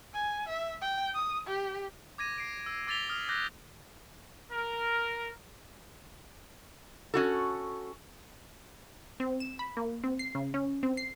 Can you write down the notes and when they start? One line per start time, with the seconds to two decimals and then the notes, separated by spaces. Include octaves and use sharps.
0.14 G#5
0.48 E5
0.81 G5
1.14 D#6
1.47 G4
2.18 D6 G#6 A#6 D#7
2.38 C7 D7
2.66 E6
2.87 D6 E6 A6 B6 F7 G7
3.09 D#6 F6 F7
3.29 D6 F#6 G6 A#6
4.52 A#4
7.14 C#4 F#4 A4
9.20 C4
9.40 E7
9.59 B5
9.77 A#3
10.04 C4
10.19 C7
10.35 C#3
10.54 C#4
10.83 C4
10.97 C7